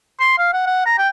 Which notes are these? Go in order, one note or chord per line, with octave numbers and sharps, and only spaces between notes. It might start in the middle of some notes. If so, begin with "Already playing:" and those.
C6
F5
F#5
F#5
A#5
G5